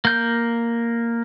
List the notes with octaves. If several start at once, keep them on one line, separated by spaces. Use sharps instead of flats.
A#3 G6